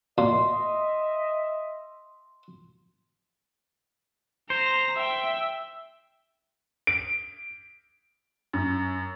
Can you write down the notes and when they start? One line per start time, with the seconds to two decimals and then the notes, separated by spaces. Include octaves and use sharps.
0.18 A#2 D#5 E5 C6
4.50 C5 A#5
4.96 E5 G5
6.87 D7
8.53 F#2